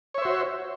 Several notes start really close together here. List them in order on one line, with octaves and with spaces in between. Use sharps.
C#5 E5 C5 F#4